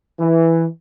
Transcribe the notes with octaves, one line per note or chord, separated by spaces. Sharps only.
E3